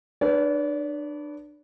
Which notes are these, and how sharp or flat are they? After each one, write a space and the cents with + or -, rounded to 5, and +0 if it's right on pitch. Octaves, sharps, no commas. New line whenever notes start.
D4 +30 B4 +0 D5 -40